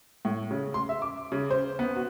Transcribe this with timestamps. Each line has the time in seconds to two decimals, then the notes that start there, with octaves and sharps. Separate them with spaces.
0.25 A2
0.51 C#3
0.74 C6
0.89 E5
1.02 D6
1.32 C#3
1.51 C5
1.79 B3
1.95 F#4